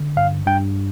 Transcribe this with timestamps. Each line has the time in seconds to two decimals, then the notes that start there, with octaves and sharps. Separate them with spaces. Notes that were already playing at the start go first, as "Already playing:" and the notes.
Already playing: D3
0.16 G2 F5
0.46 G2 G5